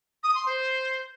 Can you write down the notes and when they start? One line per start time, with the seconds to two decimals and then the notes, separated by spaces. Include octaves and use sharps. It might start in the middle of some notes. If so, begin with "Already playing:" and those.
0.23 D#6
0.35 C6
0.46 C5